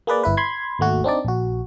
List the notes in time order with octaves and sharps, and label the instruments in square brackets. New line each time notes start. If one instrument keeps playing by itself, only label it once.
[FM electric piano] A#3 G#4 B4 D5
G1 E4 B4
B5 C6 G#6
G#1 D#2 A3 F#4
C4 D4 D#4 D5
A#1 F#4